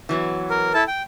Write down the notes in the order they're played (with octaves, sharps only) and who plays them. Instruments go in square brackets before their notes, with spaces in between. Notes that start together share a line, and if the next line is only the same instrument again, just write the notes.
[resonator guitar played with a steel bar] E3 F#3 B3
[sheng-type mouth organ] A#4
E4 A4 A5
G5